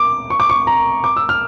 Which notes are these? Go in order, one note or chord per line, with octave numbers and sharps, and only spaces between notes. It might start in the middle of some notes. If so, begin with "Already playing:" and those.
Already playing: D6
C#6
D6
C#6
A#5
D6
E6
F6